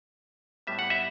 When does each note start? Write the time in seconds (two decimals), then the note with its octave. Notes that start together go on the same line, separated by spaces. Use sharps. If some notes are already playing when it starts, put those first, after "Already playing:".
0.67 A2 G3 B3 E5
0.79 F#5
0.90 E5